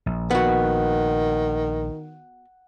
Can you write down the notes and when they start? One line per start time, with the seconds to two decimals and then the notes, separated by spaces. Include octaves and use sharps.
0.06 A#1
0.31 D#3 B3 F#4 F#5